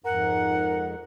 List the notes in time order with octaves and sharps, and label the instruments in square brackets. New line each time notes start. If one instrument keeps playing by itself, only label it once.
[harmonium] F2 G#2 [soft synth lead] A#4 [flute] F#5